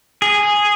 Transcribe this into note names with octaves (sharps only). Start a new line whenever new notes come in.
G#4